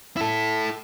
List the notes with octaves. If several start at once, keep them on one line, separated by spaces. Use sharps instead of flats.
E4 A4